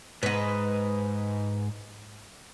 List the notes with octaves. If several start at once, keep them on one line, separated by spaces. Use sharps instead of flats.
G#2 B4 D#5